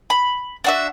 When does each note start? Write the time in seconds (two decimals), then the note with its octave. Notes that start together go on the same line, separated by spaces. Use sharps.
0.10 B5
0.64 D4 F#4 E5